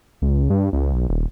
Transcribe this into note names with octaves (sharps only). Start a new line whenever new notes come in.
C#2
G2
C#2
B1
D#1